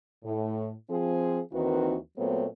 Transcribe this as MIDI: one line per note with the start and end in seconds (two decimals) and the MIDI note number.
0.24 0.72 45
0.90 1.40 53
0.90 1.40 60
0.90 1.40 68
1.52 1.96 39
1.52 1.96 51
1.52 1.96 52
1.52 1.96 60
1.52 1.96 66
1.52 1.96 71
2.17 2.46 46
2.17 2.46 54
2.17 2.46 57
2.17 2.46 59
2.17 2.46 60
2.17 2.46 73